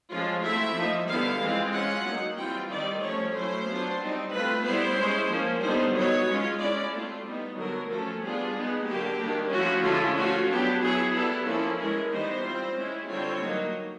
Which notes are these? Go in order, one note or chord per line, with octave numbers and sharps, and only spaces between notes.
F3 G#3 C#4 F4
A3 C4 E4 E5
F3 A#3 D#4
D3 G3 B3 E4 F5
E3 G#3 C4 F4
G#3 C#4 F4 F#5
F#3 A#3 D#4
E3 G3 C4 F4 G5
D#3 G3 C4 D#4 D5
F3 A3 C#4 C#5
F#3 A3 C#4 E4 C5
F#3 B3 D4 F4
G3 C4 D#4
A3 C4 F4 B4
G3 B3 E4 C5
G#3 C#4 E4
F3 A#3 C#4
D3 G3 B3 D#4 C5
F#3 B3 D#4 C#5
G#3 C#4 F4
G#3 C#4 E4 D5
A3 C4 F4
G3 B3 D#4
D3 F#3 B3 A#4
F3 A3 C#4 A4
G3 B3 D4 F4 G#4
G#3 B3 D#4
D3 F#3 A#3 G4
D#3 G3 A#3 D4
F3 A3 C#4 E4 F#4
D3 F3 G#3 C#4 E4 F4
A3 C#4 F4 F#4
F#3 B3 D4 G4
F#3 B3 E4 G#4
G3 B3 E4 A4
F3 A#3 C#4 E4 A4
E3 G#3 C#4 E4 A#4
E3 G3 B3 D#4 C5
G3 C4 F4
G#3 C#4 E4
D3 G3 C4 F4 C#5
F#3 A#3 D#4